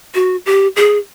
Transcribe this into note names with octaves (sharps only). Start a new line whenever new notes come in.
F#4
G4
G#4